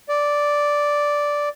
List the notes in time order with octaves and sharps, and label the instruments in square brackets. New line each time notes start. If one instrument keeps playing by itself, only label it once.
[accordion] D5